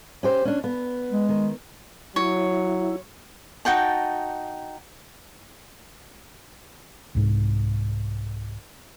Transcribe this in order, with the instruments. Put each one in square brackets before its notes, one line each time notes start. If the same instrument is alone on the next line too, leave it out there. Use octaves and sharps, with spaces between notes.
[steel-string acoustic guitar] C#4 G4 C5
C#4 D4
B3
[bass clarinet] G#3
[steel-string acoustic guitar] D#3
[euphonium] F#3 [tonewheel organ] E4 [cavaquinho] C#5
[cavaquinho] D#4 F#4 G5 A5
[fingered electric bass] C2 G#2